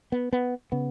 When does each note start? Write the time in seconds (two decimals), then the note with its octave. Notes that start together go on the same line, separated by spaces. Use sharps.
0.12 B3
0.33 B3
0.72 C#3 B3